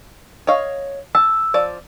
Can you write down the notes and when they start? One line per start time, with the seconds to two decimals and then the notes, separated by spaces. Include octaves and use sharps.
0.47 C#5 D#5 F5
1.15 A5 E6
1.54 F3 D5